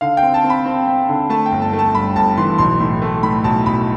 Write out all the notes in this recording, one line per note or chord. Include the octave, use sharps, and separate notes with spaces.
D3 F5
G5
C4
A5
C4
B5
C4
C4
D3
A3 A5
G5
G1
A5
A3
A5
G2 B5
G1 A5
E3 C6
B1 C6
A2
A3
A2 B5
B1 A5
B1 B5